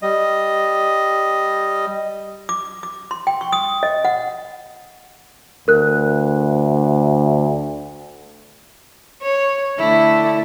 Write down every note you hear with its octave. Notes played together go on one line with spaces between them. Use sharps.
G3 D#5
D6
D6
C6
G5
C#6
D#6
D#5
F#5
D2 A#4 F#6
C#5
D3 A3 E4